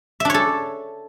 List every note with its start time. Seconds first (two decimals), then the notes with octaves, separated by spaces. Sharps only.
0.20 E5
0.25 D4
0.30 C#5
0.34 A4